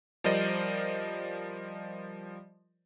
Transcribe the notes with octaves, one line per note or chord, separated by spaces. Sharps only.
F3 G3 A#4 C5 D5 D#5